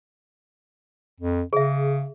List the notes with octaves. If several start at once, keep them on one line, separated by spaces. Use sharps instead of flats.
F2
C#3 G#4 E5